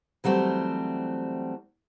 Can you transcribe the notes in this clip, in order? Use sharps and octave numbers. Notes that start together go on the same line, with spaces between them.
E3 F#3 G3 A3 C4